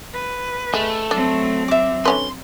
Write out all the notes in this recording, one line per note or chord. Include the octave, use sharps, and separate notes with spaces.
B4
G#3 A3
F#3 C4 D4
E5 D6
D3 C#4 B4 C6